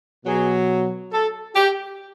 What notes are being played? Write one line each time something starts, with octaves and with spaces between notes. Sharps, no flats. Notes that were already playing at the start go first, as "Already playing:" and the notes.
B2 F#3 G#4
A4
G4